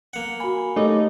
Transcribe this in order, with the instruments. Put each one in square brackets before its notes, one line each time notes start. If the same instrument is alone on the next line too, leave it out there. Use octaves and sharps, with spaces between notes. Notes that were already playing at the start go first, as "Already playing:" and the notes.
[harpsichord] A#3 F#5
[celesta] F#4 G#5 [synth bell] B5
[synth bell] A3 A4 [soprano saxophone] D#4 [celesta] G4 C#5 D6